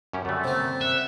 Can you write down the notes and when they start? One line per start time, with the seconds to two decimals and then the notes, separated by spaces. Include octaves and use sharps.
0.13 F#2 C#4 G4
0.25 F#2 D3 G3 A3
0.44 C3 A#3
0.81 E5 F#5